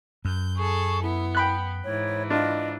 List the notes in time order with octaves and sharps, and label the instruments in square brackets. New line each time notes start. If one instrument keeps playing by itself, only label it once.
[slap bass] F#2 [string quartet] G6
[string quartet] G#4 A4 [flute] C#6
[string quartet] B3 [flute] E4
[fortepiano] G5 B5 F#6
[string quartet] G#2 E3 [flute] C#5
[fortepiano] D4 F4 [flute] D#5